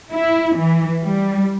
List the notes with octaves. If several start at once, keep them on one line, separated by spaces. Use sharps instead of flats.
E4
E3
G3